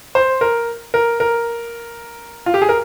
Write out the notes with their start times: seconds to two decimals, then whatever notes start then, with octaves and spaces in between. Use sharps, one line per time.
0.15 C5
0.41 A#4
0.94 A#4
1.20 A#4
2.46 F4
2.54 G4
2.62 G#4
2.69 A#4